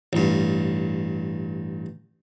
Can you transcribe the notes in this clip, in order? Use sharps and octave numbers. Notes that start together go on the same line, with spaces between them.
A1 G2